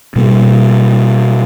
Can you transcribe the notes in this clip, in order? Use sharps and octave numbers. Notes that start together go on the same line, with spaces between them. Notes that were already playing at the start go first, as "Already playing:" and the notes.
B2 G3 A#3